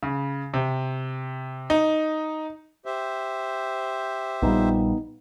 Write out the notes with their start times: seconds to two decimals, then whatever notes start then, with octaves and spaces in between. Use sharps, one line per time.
0.03 C#3
0.54 C3
1.70 D#4
2.86 G4 C5 E5
4.42 A#1 A#2 G3 B3 D#4